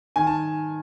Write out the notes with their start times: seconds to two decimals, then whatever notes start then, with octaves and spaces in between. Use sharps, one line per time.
0.16 D#3 G#5
0.27 A5